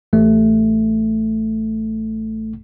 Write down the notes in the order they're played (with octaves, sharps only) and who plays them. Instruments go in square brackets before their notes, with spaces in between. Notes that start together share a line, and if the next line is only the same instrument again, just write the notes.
[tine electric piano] A1 A3